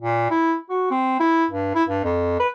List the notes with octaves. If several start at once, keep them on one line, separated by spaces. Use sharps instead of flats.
A#2
E4
F#4
C4
E4
G2
E4
G2
F2
B4